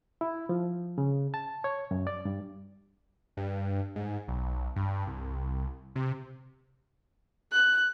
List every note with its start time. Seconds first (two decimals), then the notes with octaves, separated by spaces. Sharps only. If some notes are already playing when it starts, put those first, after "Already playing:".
0.21 E4
0.49 F3
0.98 C#3
1.34 A5
1.64 C#5
1.91 F#2
2.07 D5
2.25 G2
3.37 G2
3.96 G#2
4.28 B1
4.76 G2
5.07 C2
5.96 C3
7.52 F#6